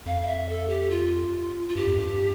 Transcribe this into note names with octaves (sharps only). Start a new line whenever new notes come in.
F2 F5
F5
E5
A4
G4
F4
F4
G2 G4
F2
G2